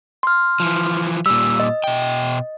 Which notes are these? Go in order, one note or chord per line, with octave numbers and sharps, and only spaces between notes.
C6 F6
E3 F3
A#2 G3 E6
D#5
B2 G5